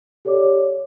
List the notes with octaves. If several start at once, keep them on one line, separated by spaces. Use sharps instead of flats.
G4 A4 C#5 D5 D6